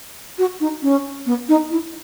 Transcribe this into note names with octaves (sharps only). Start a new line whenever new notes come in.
F#4
D#4
C#4
B3
D#4
E4